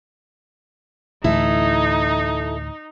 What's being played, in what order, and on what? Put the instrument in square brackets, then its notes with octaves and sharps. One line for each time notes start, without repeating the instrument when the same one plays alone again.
[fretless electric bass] D2 A2 E3 [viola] D#4 [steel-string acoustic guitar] E4 A4